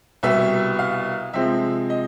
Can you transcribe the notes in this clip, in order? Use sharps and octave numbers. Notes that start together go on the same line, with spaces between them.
C2 B2 G3 B3 E5
F5
C3 F3 G#3 C4 E5
D#5